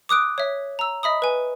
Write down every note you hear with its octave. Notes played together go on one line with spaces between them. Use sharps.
D6 D#6 F#6 D7
C#5 E5
A#5 E6
D#5 E5 B5 D#6
B4 G#5